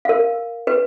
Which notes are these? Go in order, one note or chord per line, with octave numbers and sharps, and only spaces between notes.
A#4 F5
B4